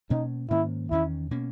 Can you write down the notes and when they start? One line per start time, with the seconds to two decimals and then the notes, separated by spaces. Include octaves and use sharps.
0.10 B2 A#3 C#4 D#4
0.50 G#2 D#3 A#3 C#4 E4
0.91 E2 D#3 A#3 C#4 E4
1.31 B2 A#3 C#4